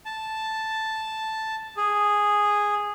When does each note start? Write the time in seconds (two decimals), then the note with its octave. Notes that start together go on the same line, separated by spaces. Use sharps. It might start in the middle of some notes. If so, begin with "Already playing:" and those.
0.06 A5
1.77 G#4